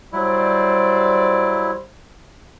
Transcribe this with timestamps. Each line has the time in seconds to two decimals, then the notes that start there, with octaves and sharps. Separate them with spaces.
0.13 F#3 G3 E4 C5 D5